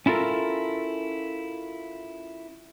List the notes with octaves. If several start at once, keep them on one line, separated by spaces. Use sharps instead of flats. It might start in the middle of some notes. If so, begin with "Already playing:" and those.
C#4 E4 F4 A4 A#4